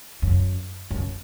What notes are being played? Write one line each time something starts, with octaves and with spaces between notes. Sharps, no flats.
F#2
F#2